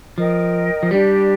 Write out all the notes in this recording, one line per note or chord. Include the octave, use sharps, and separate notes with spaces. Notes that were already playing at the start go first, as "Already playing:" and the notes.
F3 A#4 D#5 G5
F3
G3 D4 G4 D5